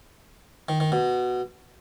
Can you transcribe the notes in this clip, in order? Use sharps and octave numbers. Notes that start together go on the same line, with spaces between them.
D#3
D#3
B2